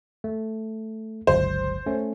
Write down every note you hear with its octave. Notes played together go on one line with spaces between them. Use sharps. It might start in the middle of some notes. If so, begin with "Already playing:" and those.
A3
G1 C#2 F#3 C5
A3 C#4